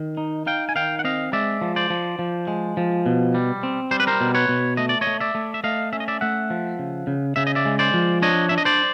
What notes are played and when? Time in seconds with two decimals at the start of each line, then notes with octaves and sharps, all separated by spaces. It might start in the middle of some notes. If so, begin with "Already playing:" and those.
Already playing: D#3
0.17 D#4
0.46 D#4 F5 G5
0.69 G#5
0.75 D#3 F5 G5
0.99 F#5
1.04 C4 D#5 F5
1.33 G#3 D5 E5
1.61 F3
1.76 C5 D5
1.90 F3
2.19 F3
2.47 G#3
2.77 F3
3.06 B2
3.34 G3
3.63 C4
3.91 G3 C5
4.00 B4
4.07 A#4 C5
4.21 B2
4.35 B4 C#5
4.49 B2
4.77 A3 D#5
4.89 D5
5.01 C#5 D#5
5.07 A3
5.20 D5 E5
5.35 A3
5.54 E5
5.64 A3 D#5 F5
5.93 C#4 E5
6.00 D#5
6.08 D5 E5
6.21 A3 E5 F#5
6.50 F3
6.79 C#3
7.07 C#3
7.36 C#3 E5
7.47 D#5
7.55 D5 E5
7.66 G#3
7.79 C5 D5
7.94 F3
8.22 D4 C#5 D#5
8.49 D4 E5
8.58 D#5
8.65 C5 D5